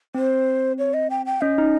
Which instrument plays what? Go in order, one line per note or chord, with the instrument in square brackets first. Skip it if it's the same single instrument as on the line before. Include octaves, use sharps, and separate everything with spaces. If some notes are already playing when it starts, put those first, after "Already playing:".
[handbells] C4 [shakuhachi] C5
[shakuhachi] C#5
D#5
G5
G5
[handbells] C#4 [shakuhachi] D#5
[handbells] D#4